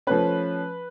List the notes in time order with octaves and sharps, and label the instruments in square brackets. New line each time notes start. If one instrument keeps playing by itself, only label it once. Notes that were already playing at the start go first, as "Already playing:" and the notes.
[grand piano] F3 A3 C#4 B4